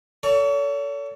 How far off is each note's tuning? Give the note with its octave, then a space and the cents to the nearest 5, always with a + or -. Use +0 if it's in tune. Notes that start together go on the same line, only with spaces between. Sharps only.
A4 +25 C#5 +40